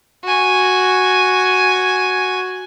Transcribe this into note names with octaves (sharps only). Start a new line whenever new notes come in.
F#4 G#5